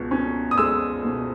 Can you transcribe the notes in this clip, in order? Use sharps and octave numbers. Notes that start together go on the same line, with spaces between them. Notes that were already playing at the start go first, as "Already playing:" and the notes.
Already playing: C#2 B2
C#4
D#6
G#3 E6
B2